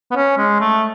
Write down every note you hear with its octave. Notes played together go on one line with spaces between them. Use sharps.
B3
C#4
G#3
A3